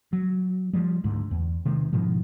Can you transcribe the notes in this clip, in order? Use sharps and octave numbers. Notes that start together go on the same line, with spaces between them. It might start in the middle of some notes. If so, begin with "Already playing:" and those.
F#3
F3 G3 G#3
D2 G#2
E2
C3 D#3 G#3
G#2 B2 D#3 F3